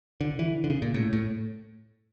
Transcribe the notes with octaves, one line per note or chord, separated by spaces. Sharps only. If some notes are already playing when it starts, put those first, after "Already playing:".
D3
E3
D3
C#3
A#2
A2
A2